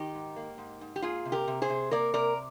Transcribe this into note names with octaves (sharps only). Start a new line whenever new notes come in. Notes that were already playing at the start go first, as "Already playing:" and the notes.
Already playing: D#3 D#4 G4
G#2
A#3
G#2
G#2
G4
A#3 F4 G#4
C3
G4 A#4
C3
G#4 C5
C3
A#3 A#4 D5
C3 A#4 D5